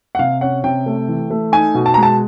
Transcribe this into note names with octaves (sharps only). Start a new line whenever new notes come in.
F#5
C3 F5
C#4 F#5
C3 G5
A3
E3
A3
D#4 G#5
B2
A5
G#3 A#5
A5